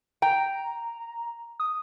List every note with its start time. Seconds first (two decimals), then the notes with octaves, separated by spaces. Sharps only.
0.22 G5 A#5
1.60 D#6